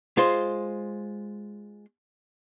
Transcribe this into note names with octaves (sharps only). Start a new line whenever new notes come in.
G#3 F4 C5